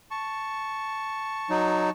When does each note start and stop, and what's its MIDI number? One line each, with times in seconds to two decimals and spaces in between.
0.11 1.91 81
0.11 1.91 85
1.50 1.90 54
1.50 1.90 63